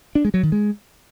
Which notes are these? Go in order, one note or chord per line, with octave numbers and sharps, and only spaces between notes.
D4
G#3
F#3
D#3
G#3